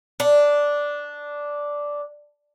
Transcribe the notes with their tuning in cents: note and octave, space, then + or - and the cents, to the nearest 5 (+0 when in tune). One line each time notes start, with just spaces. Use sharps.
D4 -5